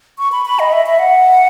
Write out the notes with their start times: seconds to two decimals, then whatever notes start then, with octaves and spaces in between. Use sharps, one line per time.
0.19 C#6
0.32 B5
0.46 B5
0.59 D#5
0.73 E5
0.86 E5
0.99 F#5